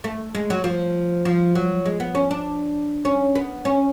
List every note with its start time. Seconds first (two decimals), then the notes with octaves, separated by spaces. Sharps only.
0.04 A3
0.35 G#3
0.50 F#3
0.64 F3
1.25 F3
1.55 F#3
1.86 G#3
2.00 B3
2.15 C#4
2.31 D4
3.05 C#4
3.35 B3
3.65 C#4